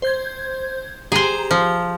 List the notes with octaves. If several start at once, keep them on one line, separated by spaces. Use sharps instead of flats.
C5 G6 G#6
G4 G#4 C5 A#5
F3